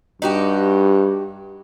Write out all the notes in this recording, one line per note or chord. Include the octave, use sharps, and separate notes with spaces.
G2 D#4 F#4 G4